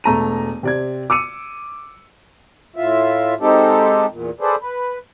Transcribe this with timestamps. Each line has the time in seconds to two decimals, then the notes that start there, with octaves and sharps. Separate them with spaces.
0.04 E1 A3 A#5 D#7
0.63 C3 D5 G#6
1.10 D6 E6 C#7 D#7
2.76 A2 F4 E5
3.41 G#3 C4 D#4 G4 A4
4.10 E2 A#2
4.41 G#4 A4 B4 C5 D5
4.61 B4